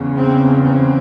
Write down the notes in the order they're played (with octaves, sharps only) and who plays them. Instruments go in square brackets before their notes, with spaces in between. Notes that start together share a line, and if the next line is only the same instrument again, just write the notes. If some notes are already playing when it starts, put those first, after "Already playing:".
Already playing: [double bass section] E2 C#3
C4
C4